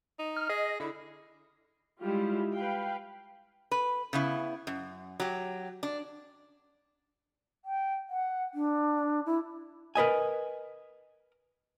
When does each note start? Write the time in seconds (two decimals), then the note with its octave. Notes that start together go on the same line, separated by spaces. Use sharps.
0.19 D#4
0.36 F6
0.49 G#4 D#5
0.80 D3 E4
2.03 G3 G#3 E4 F4 G4
2.54 B4 F5 G5
3.71 B4
4.13 C#3 B3 E4
4.67 F#2
5.20 F#3 G4
5.83 D4
7.65 G5
8.10 F#5
8.54 D4
9.26 E4
9.95 A#4 B4 D#5 G#5